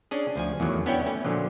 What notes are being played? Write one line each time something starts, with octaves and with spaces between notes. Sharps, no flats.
C#4 D4 G#4
D2 F3 G#5
E2 A2 D#3 F#3
B3 C#4 D4 E4 C#5 G5
A3 C#4
A#2 D3 F3 F#3